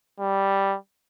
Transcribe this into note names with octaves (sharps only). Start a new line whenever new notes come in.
G3